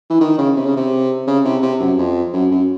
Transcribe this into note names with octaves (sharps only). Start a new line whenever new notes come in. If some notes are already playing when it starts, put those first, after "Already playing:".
E3
D#3
C#3
C3
C#3
C3
C#3
C3
C3
F#2
F2
F#2
F#2